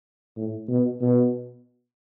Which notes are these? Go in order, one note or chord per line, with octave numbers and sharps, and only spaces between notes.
A2
B2
B2